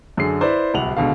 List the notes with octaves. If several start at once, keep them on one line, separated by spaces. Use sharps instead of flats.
F#2 D3 G#4 C7
E4 B4 C5 D5
D1 C2 F#5 F7 F#7
C#2 B2 D3 F5